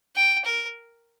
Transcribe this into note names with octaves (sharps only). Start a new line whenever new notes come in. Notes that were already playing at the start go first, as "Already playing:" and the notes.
G5
A#4